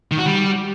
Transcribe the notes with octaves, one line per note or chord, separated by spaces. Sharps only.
D#3
F#4
G3